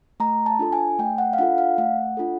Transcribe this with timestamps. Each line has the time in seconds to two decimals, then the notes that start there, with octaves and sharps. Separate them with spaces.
0.20 A3 A#5
0.46 A5
0.59 D4 F4 A4
0.72 G#5
0.99 A3 G5
1.18 F#5
1.33 F5
1.38 D4 F4 A4 F#5
1.58 F5
1.78 A3 F#5
2.17 D4 F4 A4